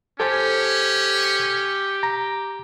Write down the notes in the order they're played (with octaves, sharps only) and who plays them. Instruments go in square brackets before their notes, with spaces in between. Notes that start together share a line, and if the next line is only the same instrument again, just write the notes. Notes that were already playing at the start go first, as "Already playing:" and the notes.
[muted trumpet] C#4 [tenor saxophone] G4 [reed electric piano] A4 C5 G#5
[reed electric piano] A#5